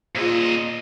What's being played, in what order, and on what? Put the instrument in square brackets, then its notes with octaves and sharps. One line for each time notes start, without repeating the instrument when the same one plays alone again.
[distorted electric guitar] A#2 D#5 [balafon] F4 G#4 C5